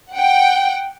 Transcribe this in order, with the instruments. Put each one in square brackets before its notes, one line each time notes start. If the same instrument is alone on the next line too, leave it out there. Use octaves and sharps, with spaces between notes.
[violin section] F#5 G5